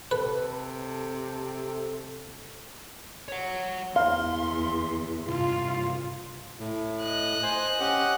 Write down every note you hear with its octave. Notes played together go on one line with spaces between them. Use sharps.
C3 A4 B4
C#5 F#5
E2 F5 C6
C2 G2 F4
A2
D#5 F#6
C5 G#5
C#4 G4 F#5